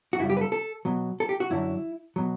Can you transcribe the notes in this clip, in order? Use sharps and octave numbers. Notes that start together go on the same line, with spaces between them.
F#4
F#2 C#3 G3 E4
G4
B4
A4
A4
B2 F#3
A4
G4
F#4
F#2 D3 F#3 E4
B2 F#3